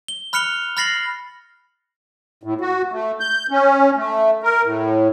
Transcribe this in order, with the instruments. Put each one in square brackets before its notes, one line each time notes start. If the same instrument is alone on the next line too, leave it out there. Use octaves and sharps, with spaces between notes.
[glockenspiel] G7
B5 F6 F#6 C#7 F7 G7
B5 F6 A6 A#6 C7 F#7
[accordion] A2
F#4
A3
G6
C#4
A3
A#4
A2